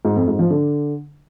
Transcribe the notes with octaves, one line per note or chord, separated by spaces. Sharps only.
G#2
F2
G#2
F3
D3